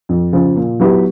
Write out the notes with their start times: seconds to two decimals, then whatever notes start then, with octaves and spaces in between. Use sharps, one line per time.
0.09 F2
0.33 C#3 F3
0.56 A#2
0.80 F#3 B3 E4 G4